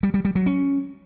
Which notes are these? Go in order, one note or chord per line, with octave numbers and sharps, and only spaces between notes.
G3
G3
G3
F#3
C#4